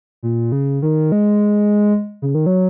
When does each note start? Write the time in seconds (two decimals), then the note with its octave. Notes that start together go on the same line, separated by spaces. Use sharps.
0.23 A#2
0.52 C#3
0.82 D#3
1.12 G#3
2.22 C#3
2.35 D#3
2.46 F#3